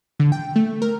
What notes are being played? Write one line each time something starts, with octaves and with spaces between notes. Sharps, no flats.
D3
G5
A3
A#4